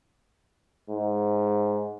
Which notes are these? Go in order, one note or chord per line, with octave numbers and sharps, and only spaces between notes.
G#2